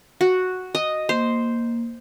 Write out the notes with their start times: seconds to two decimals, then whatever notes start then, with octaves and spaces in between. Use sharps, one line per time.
0.21 F#4
0.75 D#5
1.09 A#3 C5